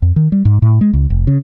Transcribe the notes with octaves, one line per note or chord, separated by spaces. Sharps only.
F2
D#3
G3
G#2
A2
G#3
C#2
F1
C#3